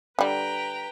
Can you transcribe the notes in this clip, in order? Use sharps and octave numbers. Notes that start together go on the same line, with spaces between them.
D3 G3 B4 G5 A#5